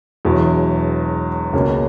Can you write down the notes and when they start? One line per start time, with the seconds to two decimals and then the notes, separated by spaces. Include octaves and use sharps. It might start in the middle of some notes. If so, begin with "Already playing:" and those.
0.25 E1 E2 B2 F#3
1.53 C#2 B2 A#3 C#4